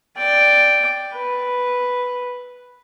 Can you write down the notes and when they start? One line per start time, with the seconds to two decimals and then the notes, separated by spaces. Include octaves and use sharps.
0.18 D5 G5
1.15 B4